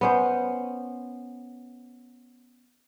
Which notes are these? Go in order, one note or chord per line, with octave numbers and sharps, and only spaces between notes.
B3 C#4 C5